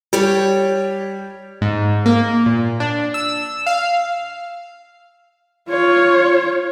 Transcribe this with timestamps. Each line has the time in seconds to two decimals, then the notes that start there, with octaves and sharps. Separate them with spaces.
0.13 G3 G4 C#5 D5
1.61 G#2
2.06 A#3
2.46 A#2
2.80 D4
3.14 E6
3.66 F5
5.69 F4 C#5